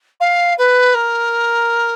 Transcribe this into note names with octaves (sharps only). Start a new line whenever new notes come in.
F5
B4
A#4